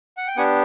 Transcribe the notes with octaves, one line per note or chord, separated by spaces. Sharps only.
F#5
G5
B3 D4 G4 F#5 G#5